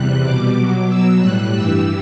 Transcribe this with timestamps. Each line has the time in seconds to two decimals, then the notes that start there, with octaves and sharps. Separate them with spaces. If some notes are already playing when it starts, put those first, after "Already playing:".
Already playing: E2 C3 G3 F#6
0.23 B2 G3 D6
0.56 B2 F#3 D6
0.87 B2 F#3 E6
1.19 A2 G3 F#6
1.51 G2 E3 G3 E6